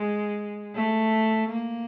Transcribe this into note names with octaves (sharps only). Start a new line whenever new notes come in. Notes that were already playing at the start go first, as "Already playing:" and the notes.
Already playing: G#3
A3
A#3